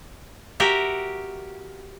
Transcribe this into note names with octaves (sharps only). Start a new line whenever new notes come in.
F#4 G4 A#4 E5 G5